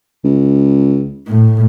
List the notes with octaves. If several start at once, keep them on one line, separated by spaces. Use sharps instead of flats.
C#2
A2